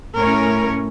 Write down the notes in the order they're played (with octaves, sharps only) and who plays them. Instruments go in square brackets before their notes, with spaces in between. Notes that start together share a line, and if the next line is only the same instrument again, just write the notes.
[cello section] A2 A3 C#4 A#4 C#5